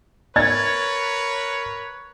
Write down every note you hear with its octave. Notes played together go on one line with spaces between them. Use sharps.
A#4 B4 C#5 G#6 A6